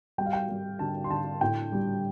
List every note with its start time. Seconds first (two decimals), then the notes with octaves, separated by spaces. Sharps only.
0.18 G3 G5
0.26 F5
0.33 G5
0.49 G3
0.79 D3 A5
1.04 C6
1.10 D3 A5
1.41 A2 G5
1.72 G3